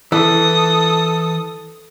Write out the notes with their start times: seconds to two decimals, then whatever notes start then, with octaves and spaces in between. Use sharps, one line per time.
0.12 E3 A4 D#6